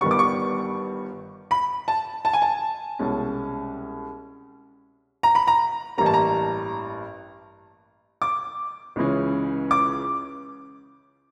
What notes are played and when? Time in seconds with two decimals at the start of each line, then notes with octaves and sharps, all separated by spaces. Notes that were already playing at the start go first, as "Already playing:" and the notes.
0.01 G1 G2 D#3 G3 B3 C#6
0.11 D6
0.19 C#6
1.51 B5
1.88 A5
2.25 A5
2.33 G#5
2.42 A5
2.99 C2 B2 G#3 C#4
5.23 A#5
5.35 B5
5.47 A#5
5.98 A1 G2 E3 G3 A#3 A#5
6.06 A5
6.14 A#5
8.22 D6
8.96 C#2 C#3 E3 G#3 C#4
9.71 D6